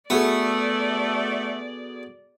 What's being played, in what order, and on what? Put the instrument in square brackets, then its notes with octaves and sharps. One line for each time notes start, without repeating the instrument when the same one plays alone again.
[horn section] A3 [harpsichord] B3 [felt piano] F#4 G#4 A4 [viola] D5